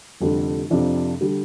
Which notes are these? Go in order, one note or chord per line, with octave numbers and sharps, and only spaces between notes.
F1 F2 D3 G3
F2 C3 F3 D4 F4
D3 G3